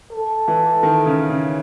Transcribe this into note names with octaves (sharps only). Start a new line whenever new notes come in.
A4
E3
D#3
C#3
C#3